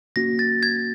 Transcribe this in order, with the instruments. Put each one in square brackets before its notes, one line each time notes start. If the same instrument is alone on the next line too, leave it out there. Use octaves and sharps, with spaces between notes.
[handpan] A#3 C#4 F#4 [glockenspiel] A#6
[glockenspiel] A6
G#6